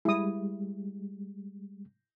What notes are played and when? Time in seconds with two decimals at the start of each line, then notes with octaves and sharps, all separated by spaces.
0.05 G3 G#3 E4 D#6